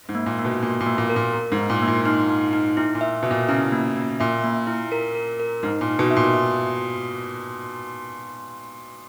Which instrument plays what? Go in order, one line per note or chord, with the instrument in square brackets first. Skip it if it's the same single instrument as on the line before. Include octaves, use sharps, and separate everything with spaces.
[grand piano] G#2
[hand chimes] A#3
[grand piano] A#2
[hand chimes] A#3
[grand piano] B2
[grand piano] A#2 [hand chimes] A#3
[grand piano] A#2
[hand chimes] A#3
[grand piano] A#2
[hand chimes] A#4
[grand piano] A#2
[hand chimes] A#4
[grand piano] G#2
[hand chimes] D#4
[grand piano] A#2
[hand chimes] A#3
[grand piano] A#2
[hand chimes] D#4
D#4
D#4
[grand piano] A#2 [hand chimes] E4
[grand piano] A#2
[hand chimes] E5
[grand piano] B2 [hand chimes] E5
[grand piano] A#2
[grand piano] C#3 [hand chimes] E4
[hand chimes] A#3
A#3
[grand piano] A#2 [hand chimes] E5
[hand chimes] A#3
E4
A#4
A#4
A#4
[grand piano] G#2 [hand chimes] D#4
[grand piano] A#2
[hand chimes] D#4
[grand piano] B2
[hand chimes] E5
[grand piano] A#2
[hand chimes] E5